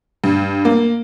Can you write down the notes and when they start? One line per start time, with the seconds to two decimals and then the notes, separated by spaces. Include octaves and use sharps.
0.24 G2
0.65 A#3